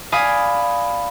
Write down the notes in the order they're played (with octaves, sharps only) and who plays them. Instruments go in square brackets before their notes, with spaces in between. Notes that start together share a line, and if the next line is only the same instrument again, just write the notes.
[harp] D5 F5 G#5 B5 D#6